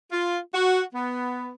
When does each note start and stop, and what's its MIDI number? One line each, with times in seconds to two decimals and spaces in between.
0.12 0.38 65
0.54 0.83 66
0.94 1.51 59